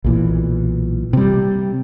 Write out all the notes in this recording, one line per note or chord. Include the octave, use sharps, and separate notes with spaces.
B1 A#2 E3
C3 G3